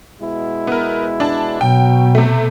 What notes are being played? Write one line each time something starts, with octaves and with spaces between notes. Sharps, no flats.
B2 G#3 E4
B3 A#4
D4 A5
B2 F#3 G5
C3 A3